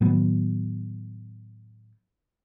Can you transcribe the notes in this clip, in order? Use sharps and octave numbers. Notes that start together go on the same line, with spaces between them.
A2 D#3 F#3 B3